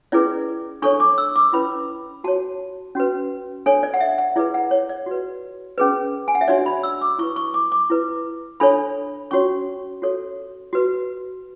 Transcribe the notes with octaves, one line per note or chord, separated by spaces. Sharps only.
C#4 E4 G#4 B4 D5
D4 A4 C#5 C#6
D6
E6
D6
C#4 E4 B4 B5
F#4 C#5 A5
C#4 F#4 B4
D4 A4 C#5 G#5
D5
F#5
E5
F#5
E4 G#4 B4 D5
F#5
C#5
D5
F#4 B4
C#4 G#4 B4
G#5
F#5
E5
D4 F#4 C#5 D5
B5
E6
D6
E4 B4 C#6
C#6
D6
D6
E4 B4
D4 A4 C#5 B5
C#4 F#4 C#5 C#6
F#4 A4 C#5
F#4 B4